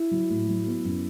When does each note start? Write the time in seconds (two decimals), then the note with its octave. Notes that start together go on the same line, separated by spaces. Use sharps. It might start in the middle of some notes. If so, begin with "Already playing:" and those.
Already playing: E4
0.11 F#3
0.30 A2
0.48 F#3
0.67 B3
0.85 F#2